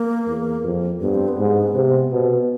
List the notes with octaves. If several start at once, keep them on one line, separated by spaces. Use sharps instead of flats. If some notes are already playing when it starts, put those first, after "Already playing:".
Already playing: A#3
E2
F2
G2 B3
C4
B3
G#2
C3
B2